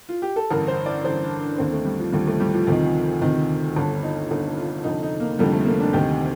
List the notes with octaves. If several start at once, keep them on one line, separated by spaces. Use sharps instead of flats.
F4
G4
A4
A1 G2 D3 A#4
C5
D5
A1 G2 D3 C5
D4
D4
D#2 D3 C4
A3
G3
F3
D#2 D3 G3
A3
G3
F3
D2 C3 D#3
D2 C3 D#3
G1 G2 D3 D4
D#4
G1 G2 D3 D#4
F4
F1 F2 D3 D#4
D#4
A#3
F1 F2 D3 G3
A3
A#3
D4
D2 C3 D#3 G4